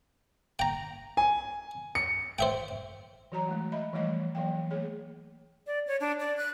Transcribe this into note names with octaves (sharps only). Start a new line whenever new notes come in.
G5 A#5
G#5
C#7
C5 E5 G5
E3 F#3 F#4 C#5 A#5
G#3 A3
D#5 E5 B5
E3 F3 G3 A3 C#5 D#5
E3 F#3 A#3 F5 G5
A3 A#3 G#4 C#5
D5
C#5
D4
D5
F#6